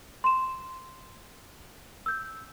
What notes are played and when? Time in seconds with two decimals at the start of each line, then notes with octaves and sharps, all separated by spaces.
0.24 C6 E7
2.06 E6 G6